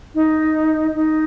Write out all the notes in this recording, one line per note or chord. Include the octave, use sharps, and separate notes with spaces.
D#4
D#4